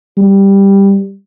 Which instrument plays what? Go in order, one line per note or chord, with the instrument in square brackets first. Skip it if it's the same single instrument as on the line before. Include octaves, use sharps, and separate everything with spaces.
[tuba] G3